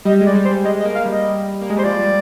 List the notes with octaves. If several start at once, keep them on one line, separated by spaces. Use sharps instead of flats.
G3 D#5
G#3
D5
G3
C5
G3
G#3 D#5
D#5
A#3
F5
G3 D#5
A#3
G#3
G3 C5
F3 D5
G3